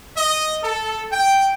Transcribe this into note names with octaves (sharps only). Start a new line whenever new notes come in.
D#5
A4
G5